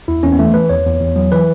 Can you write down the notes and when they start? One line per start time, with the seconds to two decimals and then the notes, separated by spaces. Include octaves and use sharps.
0.08 E2 E4
0.23 E2 C#4
0.32 B3
0.39 E3 A3
0.54 E3 B4
0.69 E2 C#5
0.85 E2
1.00 E2
1.16 F#3
1.32 E3 B4